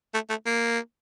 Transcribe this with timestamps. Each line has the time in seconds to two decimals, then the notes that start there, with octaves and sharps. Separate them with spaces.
0.14 A3
0.30 A3
0.46 A#3